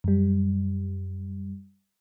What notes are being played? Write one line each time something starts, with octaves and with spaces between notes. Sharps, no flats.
F#2 G3